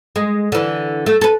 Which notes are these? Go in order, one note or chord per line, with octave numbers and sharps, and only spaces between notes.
G#3
D3 E3
A3
A4 B4